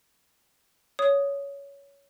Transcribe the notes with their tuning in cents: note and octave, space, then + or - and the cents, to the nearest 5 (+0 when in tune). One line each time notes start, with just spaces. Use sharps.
C#5 +15 D#6 +0